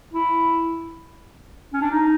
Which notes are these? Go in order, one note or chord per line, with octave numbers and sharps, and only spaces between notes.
E4
C#4
D4
D#4